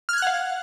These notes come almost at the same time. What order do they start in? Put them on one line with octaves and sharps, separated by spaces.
F6 G#6 F#6 F#5 F5